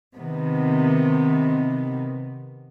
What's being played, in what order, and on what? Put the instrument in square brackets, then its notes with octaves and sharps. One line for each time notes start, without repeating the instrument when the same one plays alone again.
[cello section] C3 D#3 B3